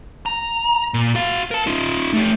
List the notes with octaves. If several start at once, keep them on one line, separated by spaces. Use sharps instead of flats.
A#5
A#2
F#4 F5
A#4 A5
D#4 F4
A3 G4